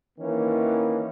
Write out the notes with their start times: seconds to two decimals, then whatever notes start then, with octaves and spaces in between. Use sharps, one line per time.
0.19 D#3 E3 A#3 C#4